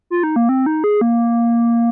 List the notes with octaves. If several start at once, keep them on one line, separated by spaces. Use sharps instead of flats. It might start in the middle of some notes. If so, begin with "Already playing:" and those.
F4
D#4
A#3
C4
D#4
G#4
A#3